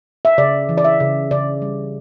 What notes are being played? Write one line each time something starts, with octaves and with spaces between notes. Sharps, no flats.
E5
C#3 D5
E3
D5
E5
C#3
C#3 D5
G3